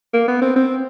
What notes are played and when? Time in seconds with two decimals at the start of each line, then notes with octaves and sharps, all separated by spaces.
0.14 A#3
0.28 B3
0.42 C4
0.56 C4